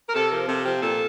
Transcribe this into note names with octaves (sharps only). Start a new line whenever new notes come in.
A#4
C3 A4
F3 A#4
C3 A4
F3 G4
A#2 A4